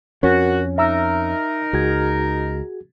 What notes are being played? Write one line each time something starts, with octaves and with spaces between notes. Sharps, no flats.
F2 C#4 F#4 A#4
D#4 A#4 E5 A#5 E6
C#2 F#4 G#4 G#6